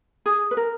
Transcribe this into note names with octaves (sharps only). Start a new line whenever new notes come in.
G#4
B4
A#4